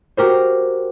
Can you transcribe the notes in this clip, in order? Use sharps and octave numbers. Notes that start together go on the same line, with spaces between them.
F#4 G4 A#4 C5